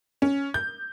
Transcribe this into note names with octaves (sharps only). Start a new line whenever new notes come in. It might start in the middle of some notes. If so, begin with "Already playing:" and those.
C#4
G6